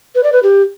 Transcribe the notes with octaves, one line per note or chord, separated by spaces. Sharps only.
B4
D5
B4
G4